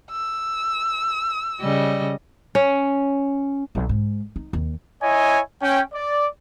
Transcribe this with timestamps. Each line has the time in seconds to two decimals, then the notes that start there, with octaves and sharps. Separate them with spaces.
0.11 E6
1.60 C#3 G3 D#5
2.55 C#4
3.75 B1
3.89 G#2
4.36 D#4
4.53 D#2
5.02 E4 C#5 D#5 G#5
5.62 C#4 G5
5.93 D5